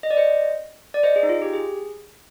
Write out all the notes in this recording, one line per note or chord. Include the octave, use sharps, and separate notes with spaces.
D#5
D5
C5 D#5
D5
C5 D#5
G#4
D#4
F4
G4
G#4